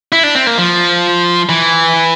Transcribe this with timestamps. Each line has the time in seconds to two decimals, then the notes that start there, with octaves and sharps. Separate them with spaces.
0.12 E4
0.23 D4
0.35 C4
0.47 A#3
0.58 F3
1.49 E3